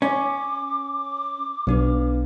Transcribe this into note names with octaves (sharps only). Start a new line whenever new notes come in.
C#4 D6
B1 B3 D4 B4